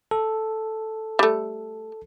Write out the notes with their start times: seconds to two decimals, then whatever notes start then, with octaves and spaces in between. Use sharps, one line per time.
0.11 A4
1.19 G3 A3